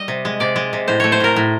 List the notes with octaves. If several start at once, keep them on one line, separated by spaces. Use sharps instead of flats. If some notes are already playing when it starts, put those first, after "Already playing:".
Already playing: G3 D#5
C3
G#3
C3 D5
G#3
C3
A2 C5
A3 C#5
C5
A2 A#4
A2